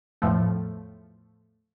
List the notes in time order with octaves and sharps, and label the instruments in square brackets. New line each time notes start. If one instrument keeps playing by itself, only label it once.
[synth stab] E2 A2 F3 A3